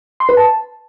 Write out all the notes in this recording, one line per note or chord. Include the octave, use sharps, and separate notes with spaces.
C6
B4
A5